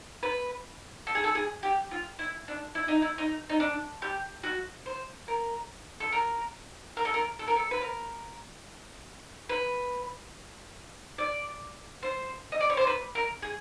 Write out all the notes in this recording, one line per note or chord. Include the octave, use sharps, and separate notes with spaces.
B4
A4
G#4
A4
G#4
G4
F4
E4
D4
E4
D#4
E4
D#4
D#4
D4
G4
F#4
C5
A#4
A4
A#4
A#4
A4
A#4
A4
A#4
A4
B4
A#4
B4
D5
C5
D#5
D5
C#5
C5
B4
A#4
G#4